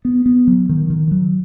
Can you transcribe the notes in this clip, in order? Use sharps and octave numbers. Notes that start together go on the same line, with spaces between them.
B3
B3
F#3
D#3
D#3
F#3